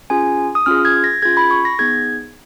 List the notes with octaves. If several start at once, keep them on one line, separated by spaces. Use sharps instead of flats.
C#4 F4 G#4 G#5
D#6
C#4 F4 G#4 F6
G#6
A#6
C#4 F4 G#4 G#6
B5
C#6
A#6
B3 D#4 G#4 G#6